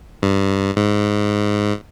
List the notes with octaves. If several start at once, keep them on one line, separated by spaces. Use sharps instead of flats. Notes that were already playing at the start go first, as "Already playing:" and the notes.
G2
G#2